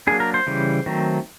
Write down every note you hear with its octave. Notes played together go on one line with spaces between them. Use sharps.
F#3 A#3 D4 G#4
A#4
C5
C#3 E3 G3
D#3 F#3 A3 C4